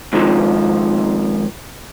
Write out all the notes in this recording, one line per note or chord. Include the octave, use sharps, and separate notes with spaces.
G#2 D#3 F3